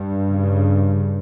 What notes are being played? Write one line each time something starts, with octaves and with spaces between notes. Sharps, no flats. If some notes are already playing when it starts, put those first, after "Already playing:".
Already playing: G2
C#3